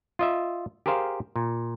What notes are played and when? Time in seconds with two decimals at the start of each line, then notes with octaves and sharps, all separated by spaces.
0.19 F4 D#5 E5
0.86 G4 G#4 A#4 C5 F5
1.36 A#2